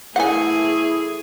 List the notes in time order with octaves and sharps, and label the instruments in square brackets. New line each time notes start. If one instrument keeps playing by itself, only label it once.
[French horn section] E3 A3 [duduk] E4 [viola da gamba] G#4 [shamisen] F#5 G#5